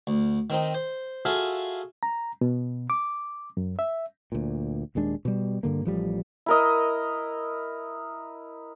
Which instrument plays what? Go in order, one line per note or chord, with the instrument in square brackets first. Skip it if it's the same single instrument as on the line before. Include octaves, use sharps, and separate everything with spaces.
[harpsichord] D2
D#3 C4 D#4
C5
F4 F#4 G#4 A4 E5 F5
[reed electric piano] A#5
B2
D6
F#2
E5
[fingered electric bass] D2 A#2
D#1 D#2 G#3 D4
B2 G3
G2 D3 A#3
A1 F3 G3
[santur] E4 A#4 D#5